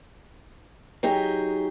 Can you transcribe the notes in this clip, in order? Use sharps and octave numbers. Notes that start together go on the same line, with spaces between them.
F#3 D#4 G4 G#4